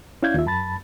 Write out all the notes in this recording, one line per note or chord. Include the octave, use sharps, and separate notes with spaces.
C#4 E4 D5 F5 G6 G#6
D#2 F4 E5
F#2 A5 B5 A6